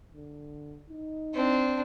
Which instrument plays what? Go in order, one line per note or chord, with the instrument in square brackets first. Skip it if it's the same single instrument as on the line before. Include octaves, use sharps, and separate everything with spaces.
[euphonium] D3
D#4
[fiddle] C4 D4